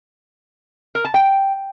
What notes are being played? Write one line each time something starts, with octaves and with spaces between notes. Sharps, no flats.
A#4
A5
G5